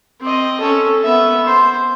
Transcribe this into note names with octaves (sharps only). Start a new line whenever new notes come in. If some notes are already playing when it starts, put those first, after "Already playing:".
C4 D#5
C#4 A4
B3 E5
C5